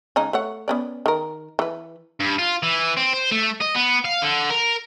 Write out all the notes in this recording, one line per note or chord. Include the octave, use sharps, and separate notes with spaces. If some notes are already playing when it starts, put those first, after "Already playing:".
C#3 G#3 D#4
A3 C#5 F#5
B3 C#4 D5
D#3 A#4
E3 B4
G2
F4
E3
C4
C5
A3
D#5
B3
F5
D3
A#4